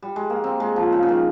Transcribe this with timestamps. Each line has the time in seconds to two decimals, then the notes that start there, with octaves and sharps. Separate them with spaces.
0.02 G3
0.16 G#3
0.30 A#3
0.44 C4
0.60 G#3
0.76 F3
0.92 C#3
1.03 C#3
1.09 D#3